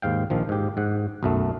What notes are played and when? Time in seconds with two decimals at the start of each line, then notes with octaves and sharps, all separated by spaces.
0.02 D#2 G#2 F5 G5
0.30 A#1 D#3 F3
0.49 G#2 G4
0.77 G#2 F#5
1.23 B1 F#2 A3